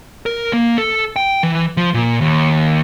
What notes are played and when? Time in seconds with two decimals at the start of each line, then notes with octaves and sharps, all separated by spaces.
0.26 A#4
0.53 A#3
0.78 A4
1.16 G5
1.43 E3
1.77 F3
1.94 A#2
2.21 D#2